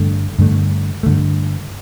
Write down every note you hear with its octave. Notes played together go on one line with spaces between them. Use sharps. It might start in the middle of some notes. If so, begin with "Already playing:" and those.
Already playing: G2 D3 A3
G2 D3 A3
G2 D3 A3